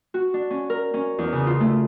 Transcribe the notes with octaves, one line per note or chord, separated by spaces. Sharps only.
F#4
D4
C#4
A#4
C#4
E2
C#3
F4
A3